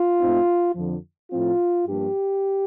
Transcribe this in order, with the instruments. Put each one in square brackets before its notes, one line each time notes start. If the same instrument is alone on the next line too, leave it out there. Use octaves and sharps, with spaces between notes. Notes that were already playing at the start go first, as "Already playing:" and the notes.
Already playing: [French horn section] F4
A2 A3 C4 D#4
F2 D3 F3
A2 F3 C4 F4
G2 F3 A#3 D4 G4